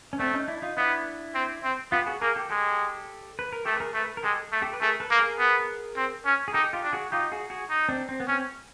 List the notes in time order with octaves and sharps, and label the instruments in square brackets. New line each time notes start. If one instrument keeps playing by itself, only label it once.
[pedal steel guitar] C#4
[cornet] A3 [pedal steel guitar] C4 D4
[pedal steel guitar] C#4 D#4
D4 E4
D#4 F4
[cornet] B3 [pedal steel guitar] D4 E4
[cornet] C4
C4
[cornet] B3 [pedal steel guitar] F4 G4
[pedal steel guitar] F#4 G#4
[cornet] A#3 [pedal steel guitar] G#4 A#4
[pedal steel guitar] G4 A4
[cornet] G#3 [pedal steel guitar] G4 A4
[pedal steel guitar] B4
A#4
[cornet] A3 [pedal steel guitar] G4 A4
[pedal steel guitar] B4
G#4 A#4
[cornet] A3 [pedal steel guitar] A4 B4
[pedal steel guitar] A#4
[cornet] G#3 [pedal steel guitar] G4 A4
[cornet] A3
[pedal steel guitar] G4 A4
B4
[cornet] A3 [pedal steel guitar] G#4 A#4
[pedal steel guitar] A4 B4
[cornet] A#3
[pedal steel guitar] G#4 A#4
[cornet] B3
C4
C#4
[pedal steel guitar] G#4
[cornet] D#4 [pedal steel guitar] G4 A4
[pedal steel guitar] F4 G4
[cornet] D4
[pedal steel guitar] F#4 G#4
[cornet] D#4 [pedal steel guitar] F4 G4
[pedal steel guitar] F#4 G#4
F#4 G#4
[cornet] D#4
[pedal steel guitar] C4 D4
C4
B3
[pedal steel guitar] C4 [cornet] C#4